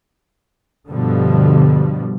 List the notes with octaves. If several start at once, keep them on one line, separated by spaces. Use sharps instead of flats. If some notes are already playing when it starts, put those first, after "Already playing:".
G2 B2 D3 F3 G3